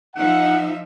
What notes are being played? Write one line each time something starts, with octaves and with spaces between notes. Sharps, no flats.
F3 D#4 E5 F#5